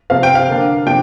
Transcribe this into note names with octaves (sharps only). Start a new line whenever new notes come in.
C3 F3 C4 F5
G5
F5
D3 A#3 D4
C3 F3 D4 G5